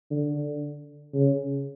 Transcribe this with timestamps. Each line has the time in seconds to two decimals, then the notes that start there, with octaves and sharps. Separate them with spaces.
0.11 D3
1.14 C#3